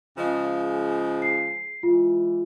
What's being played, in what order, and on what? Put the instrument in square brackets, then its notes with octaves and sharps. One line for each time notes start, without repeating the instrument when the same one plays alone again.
[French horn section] F2 D#5 [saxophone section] C#3 F3 G#3
[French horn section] G#4
[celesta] C7
[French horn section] E3 G#3 [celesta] F4